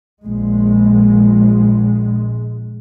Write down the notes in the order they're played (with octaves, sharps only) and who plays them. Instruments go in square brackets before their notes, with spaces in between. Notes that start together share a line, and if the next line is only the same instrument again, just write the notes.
[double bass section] A#1 G#3